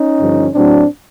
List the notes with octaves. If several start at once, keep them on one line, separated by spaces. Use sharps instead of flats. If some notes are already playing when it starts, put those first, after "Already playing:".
Already playing: C#4 D#4
G2 D3 F3
A2 F#3 C4 D4